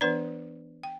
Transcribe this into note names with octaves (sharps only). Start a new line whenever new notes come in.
E3 B3 D4 B4 D5
G5